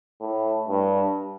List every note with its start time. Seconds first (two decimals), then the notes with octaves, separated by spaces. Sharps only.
0.21 A2
0.68 G2